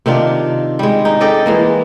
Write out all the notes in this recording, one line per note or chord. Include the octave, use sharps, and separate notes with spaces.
C3 D#3 D4 F4
G3 G#3
D#4
G4 A4 D5 D#5
E3 G#3 A#3